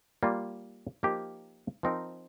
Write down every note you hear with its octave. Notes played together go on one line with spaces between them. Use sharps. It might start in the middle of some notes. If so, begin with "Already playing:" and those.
G3 A#3 F4
F3 A#3 D#4 G4 A#4
F3 C4 D#4 A#4